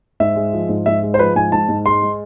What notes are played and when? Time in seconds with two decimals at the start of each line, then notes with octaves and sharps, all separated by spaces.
0.20 G#2 E5
0.36 G#3
0.53 F3
0.69 G#2
0.86 G#2 E5
1.02 G#3
1.14 C5
1.19 F3 B4
1.36 G#2 G#5
1.52 G#2 A5
1.69 G#2
1.85 G#3 C6
2.02 G#3